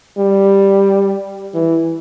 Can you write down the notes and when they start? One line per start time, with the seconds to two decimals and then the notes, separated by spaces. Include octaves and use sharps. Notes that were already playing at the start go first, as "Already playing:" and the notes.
0.18 G3
1.54 E3